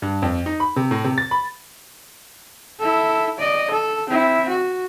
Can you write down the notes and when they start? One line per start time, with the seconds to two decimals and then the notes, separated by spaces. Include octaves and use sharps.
0.02 G2
0.22 F2
0.46 D#4
0.60 B5
0.76 C3
0.91 A2
1.04 C3
1.18 A6
1.31 B5
2.80 E4 A4
3.39 D5 D#5
3.71 A4
4.10 C4 E4
4.49 F#4